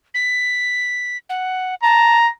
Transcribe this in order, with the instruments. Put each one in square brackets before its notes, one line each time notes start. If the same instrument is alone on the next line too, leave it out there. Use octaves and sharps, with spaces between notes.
[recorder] B6
F#5
[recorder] A5 [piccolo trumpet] A#5